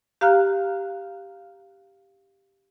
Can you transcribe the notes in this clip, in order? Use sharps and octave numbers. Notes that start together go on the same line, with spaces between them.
G4 F5 A#5 F6 F#6